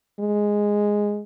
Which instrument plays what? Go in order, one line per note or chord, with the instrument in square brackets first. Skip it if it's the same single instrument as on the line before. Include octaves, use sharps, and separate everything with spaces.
[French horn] G#3